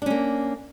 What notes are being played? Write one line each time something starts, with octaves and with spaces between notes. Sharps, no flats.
A#3 C#4 D4